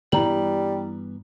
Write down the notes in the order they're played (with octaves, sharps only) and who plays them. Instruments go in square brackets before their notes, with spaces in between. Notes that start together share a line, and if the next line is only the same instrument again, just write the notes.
[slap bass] G2 E3 B3 [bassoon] G3 [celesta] E4 A#5 F#7